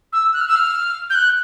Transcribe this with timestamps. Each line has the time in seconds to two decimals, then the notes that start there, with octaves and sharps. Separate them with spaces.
0.12 E6
0.33 F#6
0.41 F6
0.48 E6
0.56 F6
1.10 G6
1.15 F#6